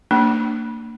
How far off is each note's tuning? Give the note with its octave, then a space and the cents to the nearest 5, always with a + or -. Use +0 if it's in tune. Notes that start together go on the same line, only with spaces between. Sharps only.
A#3 -30 D4 +0